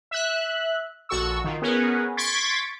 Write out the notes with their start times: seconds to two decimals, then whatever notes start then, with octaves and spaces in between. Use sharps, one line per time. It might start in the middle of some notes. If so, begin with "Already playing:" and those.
0.11 E5 F#6
1.09 A#1 F#4 A4 C#6 E6
1.44 D#3 F4
1.62 B3 C#4 G#4 A#4 B4
2.17 C6 C#6 G#6 A6 B6 D7